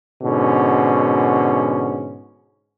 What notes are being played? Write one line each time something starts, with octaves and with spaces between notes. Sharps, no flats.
G#2 B2 D3 C#4